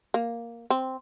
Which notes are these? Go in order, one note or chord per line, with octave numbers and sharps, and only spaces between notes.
A#3
C4